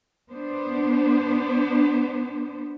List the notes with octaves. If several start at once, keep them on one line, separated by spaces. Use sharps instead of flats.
B3 D4 C5